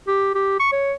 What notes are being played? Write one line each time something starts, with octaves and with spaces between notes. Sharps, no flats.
G4
G4
C#6
C#5